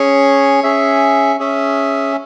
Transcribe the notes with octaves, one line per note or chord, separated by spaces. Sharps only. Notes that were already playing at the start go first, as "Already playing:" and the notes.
Already playing: C#4 G#4 C#5
C#4 G#4 E5
C#4 G#4 E5